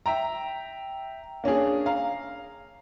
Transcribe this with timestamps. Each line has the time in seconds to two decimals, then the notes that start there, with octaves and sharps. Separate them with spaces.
0.06 E5 G5 A#5
1.44 A#3 C#4 D4 G#4
1.86 F5 A#5